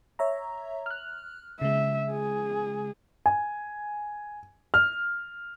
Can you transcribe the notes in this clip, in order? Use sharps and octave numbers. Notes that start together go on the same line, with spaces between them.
C#5 E5 A#5
F6 F#6
C#3 G#3 E5
G#4
G#5
F6